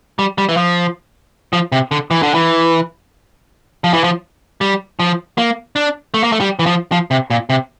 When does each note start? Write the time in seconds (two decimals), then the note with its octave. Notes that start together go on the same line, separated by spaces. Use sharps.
0.19 G3
0.38 G3
0.49 E3
0.57 F3
1.53 F3
1.72 C3
1.91 D3
2.11 E3
2.23 D3
2.34 E3
3.84 F3
3.93 E3
4.04 F3
4.61 G3
5.00 F3
5.38 A#3
5.76 D4
6.14 A3
6.24 A#3
6.32 A3
6.40 G3
6.59 E3
6.66 F3
6.92 F3
7.11 C3
7.30 A#2
7.50 C3